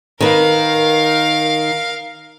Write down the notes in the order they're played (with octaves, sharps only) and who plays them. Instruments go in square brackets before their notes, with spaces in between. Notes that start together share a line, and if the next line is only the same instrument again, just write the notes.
[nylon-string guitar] D#3 B4 [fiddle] A#4 F5